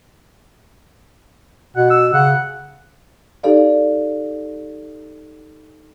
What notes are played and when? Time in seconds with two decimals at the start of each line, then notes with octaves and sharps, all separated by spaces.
1.76 B2 F#5
1.90 E6
2.14 C#3 F#5
3.43 D#4 G4 A4 D5 F5